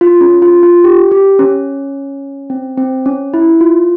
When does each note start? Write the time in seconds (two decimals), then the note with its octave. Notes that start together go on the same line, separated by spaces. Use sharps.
0.01 F4
0.21 C#4
0.42 F4
0.63 F4
0.84 G4
1.12 G4
1.39 C#4
2.50 C4
2.78 C4
3.06 C#4
3.34 E4
3.61 F4